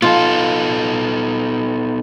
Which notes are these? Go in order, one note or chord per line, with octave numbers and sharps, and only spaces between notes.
B3 D#4 F4 A4